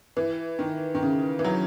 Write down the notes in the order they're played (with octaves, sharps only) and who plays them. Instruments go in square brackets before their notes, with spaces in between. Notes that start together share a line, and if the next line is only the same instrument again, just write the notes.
[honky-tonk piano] E3
D#3
D#3
C#3
E3
F#3